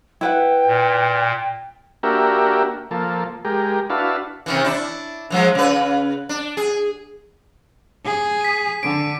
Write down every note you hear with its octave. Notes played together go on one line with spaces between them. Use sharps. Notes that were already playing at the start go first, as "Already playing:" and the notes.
E4 B4 F#5 G5
A#2
A#3 D4 F#4 G4 A#4 E5
F3 A#3 A4
G#3 G4 A#4
D4 E4 F#4 B4 F5 A5
C3 D#3 E3
D4 E4
E3 F3 G#3
C#3 B4
D4
G#4
G#4
B6 D#7
D3 D7